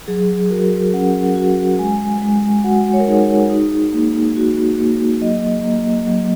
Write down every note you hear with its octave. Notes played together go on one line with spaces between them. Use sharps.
F#3 G#4
F#4 A#4
C#4 F#5
F#4
G#3 G#5
G#3
F#4 F#5
C#5
A#4
D#4 G#4
D#4
A#3
F#4
A#3
F#3 D#5
A#3
F#3